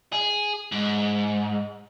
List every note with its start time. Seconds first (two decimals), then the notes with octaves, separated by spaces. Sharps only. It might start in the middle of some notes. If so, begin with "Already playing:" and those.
0.13 G#4
0.72 G#2